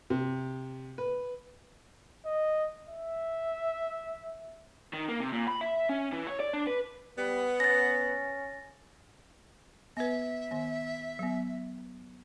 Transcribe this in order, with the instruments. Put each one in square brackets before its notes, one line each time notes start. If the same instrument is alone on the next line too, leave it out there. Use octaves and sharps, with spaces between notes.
[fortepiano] C3
B4
[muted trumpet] D#5
E5
[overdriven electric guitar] D#3
A#3
C3
A#2
B5
E5
C#4
E3
C#5
D5
D4
B4
[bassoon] G3 [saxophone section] B3
[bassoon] C#4 [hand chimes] A6 A#6
[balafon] B3 B4 [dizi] E5
[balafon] D#3 B3
F#3 B3